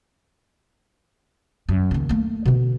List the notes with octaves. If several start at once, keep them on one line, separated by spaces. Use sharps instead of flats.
F#2
D#2 C#3
A3 A#3
B2 D3